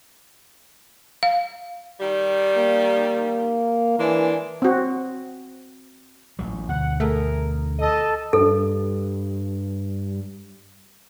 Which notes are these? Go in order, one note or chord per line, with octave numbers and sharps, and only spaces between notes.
F5
D#3 G3
A#3
E3 G#3 A#3 D4
C4 F#4
A1 F#3
D2 B2 F#5
A3 G#4 A#4
A4 D#5
G2 A4